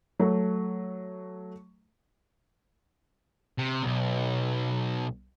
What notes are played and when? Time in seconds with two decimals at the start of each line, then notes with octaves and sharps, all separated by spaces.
0.19 F#3 A3
3.58 C3
3.83 B1